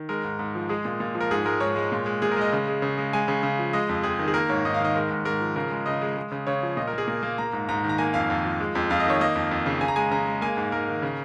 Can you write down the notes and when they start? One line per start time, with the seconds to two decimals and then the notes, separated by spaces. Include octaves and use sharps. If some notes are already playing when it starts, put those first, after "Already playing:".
Already playing: D#3
0.09 G#3 A#4
0.24 G#2
0.39 G#2
0.55 F3
0.69 G#3 G#4
0.85 A#2
1.00 A#2
1.15 F3
1.21 A#4
1.31 G#2 G#4
1.45 G#3 A#4
1.60 G#2 C#5
1.76 G#3
1.92 A#2
2.06 G#3
2.22 A#2 G#4
2.31 A#4
2.37 G#3 D#5
2.53 C#3
2.68 G#3
2.82 C#3
2.97 G#3
3.13 G#3 G#5
3.28 C#3
3.43 C#3
3.59 F3
3.73 G#3 D#5
3.89 F2
4.03 F2 G#4
4.19 D#3
4.28 G#4
4.34 A#3 A#4
4.49 G#2 C#5
4.65 G#2 D#5
4.74 F5
4.80 D#3 D#5
4.95 G#3 A#4
5.11 G#2
5.25 G#2 A#4
5.41 F3
5.56 C#3 A#4
5.71 G#3
5.86 C#3 D#5
6.01 G#3
6.17 G#3
6.32 C#3
6.47 C#3 C#5
6.63 F3
6.77 A#2 D#5
6.87 A#4
6.93 A#3 G#4
7.08 A#2 A#4
7.23 A#3
7.38 A#3 A#5
7.53 G#2
7.69 G#2 A#5
7.84 D#3
7.89 A#5
7.98 A#3 G#5
8.14 F2 F5
8.30 F2
8.45 F3
8.60 G#3
8.75 F2
8.90 F2 F5
9.00 D#5
9.06 D#3 C#5
9.20 A#3 D#5
9.35 F2
9.51 F2
9.66 C#3
9.81 C#3 G#5
9.88 A#5
9.96 G#3 G#5
10.11 C#3 A#5
10.27 G#3
10.41 A#3 G#5
10.57 G#2
10.72 G#2 A#4
10.88 D#3
11.02 C#3